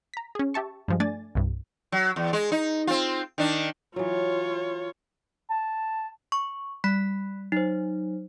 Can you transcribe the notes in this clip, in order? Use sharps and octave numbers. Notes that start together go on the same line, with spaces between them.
A#5 B6
C#4 G#4
G4 E5 A5 C#6
G2 F3 G#3
A3 D4 D5 G#5 A6
C2 G2
F#3
E2
G#3
D#4
C4 F4
D#3 D4
E3 F#3 F4 C#5
A5
C#6
G3 B5 F#6 B6
F#3 D#4 C5